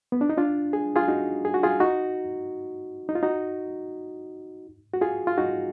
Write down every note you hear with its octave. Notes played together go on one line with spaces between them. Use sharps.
B3
D4
D#4
D4 F4
G#4
F4 G#4
D#4 F#4
G#4
F#4
F4 G#4
D#4 F#4
D#4
F4
D#4 F#4
F#4
F4 G#4
F4
D#4 F#4